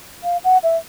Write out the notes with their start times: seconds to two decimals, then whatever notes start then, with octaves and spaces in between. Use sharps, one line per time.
0.24 F5
0.44 F#5
0.63 E5